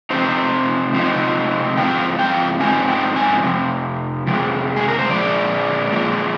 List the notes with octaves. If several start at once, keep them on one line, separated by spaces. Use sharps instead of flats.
C3 F3 G#3 C4 D#4 C5
C3 F3 G#3 C4 D#4
G#2 F3 C4 G5
G5
G#2 F3 C4 D#4 G#5
G5
G#5
F2 C3
F2 C3 G#3
G#4
A#4
C5
A#2 F3 G#3 D5
A#2 F3 G#3